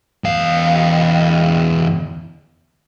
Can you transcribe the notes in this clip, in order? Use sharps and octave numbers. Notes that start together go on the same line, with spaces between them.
E2 F5